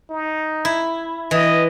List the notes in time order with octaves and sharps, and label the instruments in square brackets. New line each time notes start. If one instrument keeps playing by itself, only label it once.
[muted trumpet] D#4
[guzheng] E4
[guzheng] E3 [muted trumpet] D#5